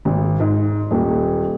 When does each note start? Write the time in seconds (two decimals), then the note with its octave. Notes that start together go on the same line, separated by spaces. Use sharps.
0.05 G#1
0.40 G#2
0.91 D#1